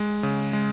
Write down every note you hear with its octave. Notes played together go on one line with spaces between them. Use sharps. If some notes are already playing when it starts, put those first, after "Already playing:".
Already playing: G#3
C#3
G#3